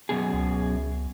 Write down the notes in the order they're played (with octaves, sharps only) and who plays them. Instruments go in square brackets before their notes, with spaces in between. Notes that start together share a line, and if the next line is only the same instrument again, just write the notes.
[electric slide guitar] F#2 B2 G#4
[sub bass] C#2